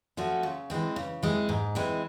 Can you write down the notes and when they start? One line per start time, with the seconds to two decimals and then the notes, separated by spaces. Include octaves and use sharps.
0.17 F3 A3 C#4 F#4
0.43 C#3
0.70 E3 G#3 C4
0.96 C#3
1.22 E3 G#3 C4
1.49 G#2
1.75 E3 G#3 C4